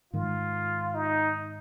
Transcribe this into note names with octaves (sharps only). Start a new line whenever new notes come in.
G#2 D#3 G#3 F4
D#4